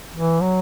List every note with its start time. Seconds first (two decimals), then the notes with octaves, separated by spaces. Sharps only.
0.16 E3
0.41 F#3